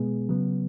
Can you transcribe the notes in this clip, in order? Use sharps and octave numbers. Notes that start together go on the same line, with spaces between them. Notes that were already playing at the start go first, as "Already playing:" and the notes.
Already playing: B2 G#3 B3 G#4
C#3 F#3 B3